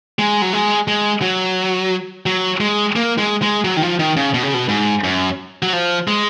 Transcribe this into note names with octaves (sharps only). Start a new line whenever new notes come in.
G#3
F#3
G#3
G#3
F#3
F#3
G#3
A#3
G#3
G#3
F#3
D#3
F3
D#3
C#3
B2
C#3
B2
G#2
F#2
F#3
F3
G#3